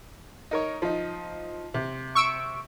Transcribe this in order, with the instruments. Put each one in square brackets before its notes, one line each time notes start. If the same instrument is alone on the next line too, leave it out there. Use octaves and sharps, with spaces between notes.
[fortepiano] D#4 A#4 C#5
F3 D#4
C3
[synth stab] C#6 E6 D7